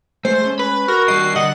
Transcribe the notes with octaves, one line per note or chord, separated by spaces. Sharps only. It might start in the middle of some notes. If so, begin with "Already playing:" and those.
G#3 A3 C5
G#3 C#4
B4 B5
F#4 A#4
G3 D4 G4 A#4 D#5 C7
D3 D#5 F#5